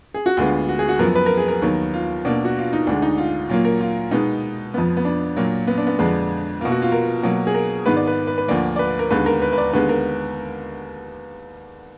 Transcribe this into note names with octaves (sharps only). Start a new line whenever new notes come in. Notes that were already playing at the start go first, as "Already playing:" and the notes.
G#4
F#4
D2 D3 G#3 B3 F4
F#4
G#4
F#4
F#2 F3 B3 A#4
B4
A#4
G#4
A#4
D#2 D#3 F#3 B3
F4
B2 A#3 D4
F#4
F4
D#4
D2 D3 G#3 D4
D#4
F4
A#2 F#3 A#3 F4
A#4
F4
B2 G#3 B3 D#4
F2 F3 B3
B3
D4
A#2 F#3 A#3
B3
D4
B3
F2 D3 G#3 B3 D4
B2 A#3 F4
F#4
F4
A#4
B2 F#3 A#3
G#4
A#4
G#2 D#3 G#3 B3 B4
D5
B4
B4
B4
D2 D3 F3 A#3 D5
D5
B4
A#4
D#2 D3 G#3 B3 B4
A#4
B4
B4
D5
D#2 D3 G#3 B3 B4
A#4